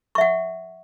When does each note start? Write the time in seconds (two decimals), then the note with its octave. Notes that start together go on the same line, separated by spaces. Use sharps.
0.15 C#6
0.18 E5
0.21 F#5